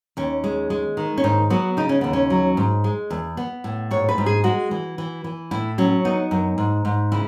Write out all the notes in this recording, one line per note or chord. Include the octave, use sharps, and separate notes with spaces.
D#2 C#4
G#3
G#3
D#3
C#4
G#2 D#4
F#3 B3
C#3 D#4
C#4
D#2 B3
C#4
F#3
G#2
G#3
E2
B3
A2
G#2 C#5
B4
G#2
G#4
G#3 F#4
E3
E3
E3
A2 E4
F#3 C#4
B3 D#4
F#2
G#2
G#2
C#3 E4